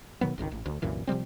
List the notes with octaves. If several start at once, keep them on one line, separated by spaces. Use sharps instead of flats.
B2 D#3 F#3 B3
G#1 C#2 C3 D#3
A1
D2
C2 F#2 A#2 E3
C3 F3 G3 C4